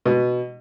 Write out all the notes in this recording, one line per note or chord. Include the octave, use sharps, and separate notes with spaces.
B2